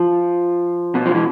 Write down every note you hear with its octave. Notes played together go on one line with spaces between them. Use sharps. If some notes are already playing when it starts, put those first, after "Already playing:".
Already playing: F3
B2
F3
E3